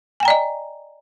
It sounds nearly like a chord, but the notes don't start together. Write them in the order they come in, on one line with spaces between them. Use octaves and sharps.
G#5 G5 A#5 D5 D#5